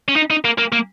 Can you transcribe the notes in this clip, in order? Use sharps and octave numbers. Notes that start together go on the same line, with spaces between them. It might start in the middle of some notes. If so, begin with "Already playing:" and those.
C#4
D#4
D#4
A#3
A#3
A#3